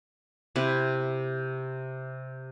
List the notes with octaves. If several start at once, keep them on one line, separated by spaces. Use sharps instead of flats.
C3 E4 B4